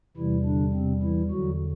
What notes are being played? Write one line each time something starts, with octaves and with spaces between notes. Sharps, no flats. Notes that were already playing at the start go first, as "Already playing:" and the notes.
E2 C3 E3 G3 E4
D3 D4
C3 C4
E3 E4
E2 D3 F#3 F#4